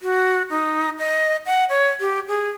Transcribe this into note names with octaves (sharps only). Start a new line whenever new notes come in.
F#4
D#4
D#5
F#5
C#5
G4
G#4